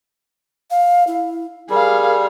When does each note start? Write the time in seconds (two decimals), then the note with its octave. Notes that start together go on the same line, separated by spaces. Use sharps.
0.70 F5
1.07 E4
1.70 G3 G#4 A#4 F5